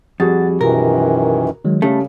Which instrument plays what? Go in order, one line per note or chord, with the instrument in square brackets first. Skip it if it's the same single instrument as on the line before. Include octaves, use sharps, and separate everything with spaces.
[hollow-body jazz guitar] F2 [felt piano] G3 F#4 G#4 [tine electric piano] F#5 A6
[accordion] F#2 D#3 E3 [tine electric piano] B2 F4 [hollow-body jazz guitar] A#4
[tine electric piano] D#3 F#3 G#3
[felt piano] C#3 G3 [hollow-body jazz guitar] A3 [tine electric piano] A5